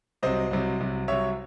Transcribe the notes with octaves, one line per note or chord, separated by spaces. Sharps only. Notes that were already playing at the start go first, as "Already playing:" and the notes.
C2 C3 F#3 C5 D#5
C2 C3 F#3
C2 C3 F#3
C2 C3 F#3 C#5 E5